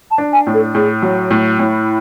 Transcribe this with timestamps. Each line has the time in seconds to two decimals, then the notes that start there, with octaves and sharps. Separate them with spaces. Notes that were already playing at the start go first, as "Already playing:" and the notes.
0.11 A5
0.18 D4
0.32 G#5
0.47 A2
0.53 A4
0.75 A2 G#4
1.02 F#3
1.31 A2
1.59 A2 E4